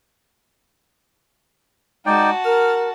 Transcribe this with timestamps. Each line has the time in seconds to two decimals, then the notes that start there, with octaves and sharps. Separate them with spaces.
2.06 G#3 D#4 F#4 D5 G5 A5
2.45 A#4 F6